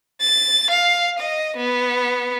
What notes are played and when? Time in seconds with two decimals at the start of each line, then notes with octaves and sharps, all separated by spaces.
0.21 A6
0.71 F5
1.20 D#5
1.57 B3